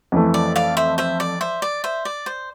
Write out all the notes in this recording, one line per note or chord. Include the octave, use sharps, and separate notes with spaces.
F2 E3 A3
D5
D5 F5
C5 E5
C5 E5
D5
C5 E5
D5
C5 E5
D5
C5